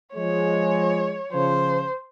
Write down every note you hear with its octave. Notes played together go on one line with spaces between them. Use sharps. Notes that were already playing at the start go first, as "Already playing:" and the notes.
F3 G#3 C#5
C#3 F3 C5